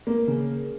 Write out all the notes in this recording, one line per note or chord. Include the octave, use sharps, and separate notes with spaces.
A#3
C#3